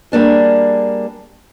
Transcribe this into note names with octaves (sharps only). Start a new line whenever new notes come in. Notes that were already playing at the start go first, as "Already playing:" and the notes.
G3 A#3 D4 G#4